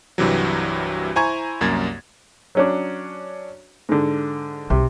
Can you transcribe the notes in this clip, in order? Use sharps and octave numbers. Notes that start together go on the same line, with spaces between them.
C2 G2 C3 E3 F#3
E4 C5 G#5 A#5 C#6 G#6
C2 F#2 A#3 G#6 A6
F#3 C#4 D4
G#2 D3
B1 C3